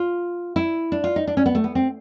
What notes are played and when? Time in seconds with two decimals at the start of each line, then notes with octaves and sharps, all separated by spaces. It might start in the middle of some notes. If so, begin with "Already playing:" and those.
Already playing: F4
0.56 E4
0.92 D4
1.04 F4
1.16 D#4
1.27 D4
1.37 C#4
1.46 B3
1.55 A3
1.64 B3
1.75 C4